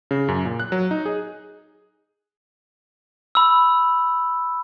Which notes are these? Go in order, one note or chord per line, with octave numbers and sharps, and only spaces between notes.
C#3
F#2
A#2
F#6
F#3
D#4
G#4
B5 E6